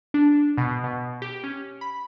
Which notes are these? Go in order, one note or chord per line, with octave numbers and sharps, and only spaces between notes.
D4
B2
B2
G4
C#4
B5